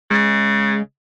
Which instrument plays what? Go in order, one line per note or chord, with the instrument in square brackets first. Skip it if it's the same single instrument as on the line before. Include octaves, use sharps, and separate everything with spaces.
[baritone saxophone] C#3 [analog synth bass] G#3